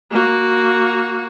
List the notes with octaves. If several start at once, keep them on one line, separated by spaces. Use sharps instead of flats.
A#3 F#4